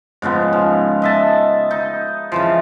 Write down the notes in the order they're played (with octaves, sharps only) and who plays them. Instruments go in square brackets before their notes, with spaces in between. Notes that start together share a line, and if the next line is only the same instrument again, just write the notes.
[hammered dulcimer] G#2 C#3 F3 B3
F3
D#5 E5 A5
D#4
C#3 E3 F3